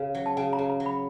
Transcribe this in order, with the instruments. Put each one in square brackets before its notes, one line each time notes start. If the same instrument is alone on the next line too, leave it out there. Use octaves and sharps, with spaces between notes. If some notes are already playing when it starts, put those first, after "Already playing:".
Already playing: [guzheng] C#3
F#3
[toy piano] A5
[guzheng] C#3 [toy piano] G#5
[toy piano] A#5
[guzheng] C#3
[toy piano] A#5
[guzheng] F#3
[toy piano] B5